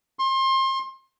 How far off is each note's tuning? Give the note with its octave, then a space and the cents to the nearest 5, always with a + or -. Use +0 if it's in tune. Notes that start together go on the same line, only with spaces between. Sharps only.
C6 +30